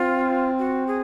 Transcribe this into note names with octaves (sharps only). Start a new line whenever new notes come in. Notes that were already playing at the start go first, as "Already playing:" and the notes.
Already playing: C4 F4
F#4
G#4